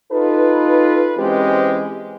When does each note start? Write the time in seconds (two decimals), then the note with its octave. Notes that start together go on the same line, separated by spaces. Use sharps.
0.12 D#4 F4 A4 B4
1.18 E3 G#3 C4 C#4 G4 C5